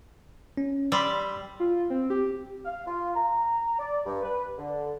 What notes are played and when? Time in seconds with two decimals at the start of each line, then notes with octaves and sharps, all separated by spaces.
0.57 C#4
0.92 G3 B5 C6 E6
1.60 F4
1.90 C4
2.10 G4
2.65 F5
2.87 F4
3.15 A#5
3.79 D5
4.06 G2
4.23 B4
4.58 D3